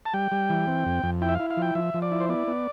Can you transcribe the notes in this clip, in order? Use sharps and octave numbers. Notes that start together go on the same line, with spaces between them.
A5
G3 G5
G3
E3
C4
F2
F2
E4 G5
E5
E4 F5
F5
F3
G5
F3 E5
F3
D5
E4
C5
B3 D5
B3